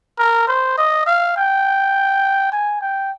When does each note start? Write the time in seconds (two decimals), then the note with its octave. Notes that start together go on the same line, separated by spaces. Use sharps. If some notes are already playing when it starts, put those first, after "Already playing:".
0.19 A#4
0.48 C5
0.78 D#5
1.06 F5
1.36 G5
2.52 G#5
2.81 G5